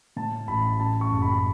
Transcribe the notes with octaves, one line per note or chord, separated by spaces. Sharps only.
A2 A5
A1 B5
C#4 A5
C#6
F#1
B5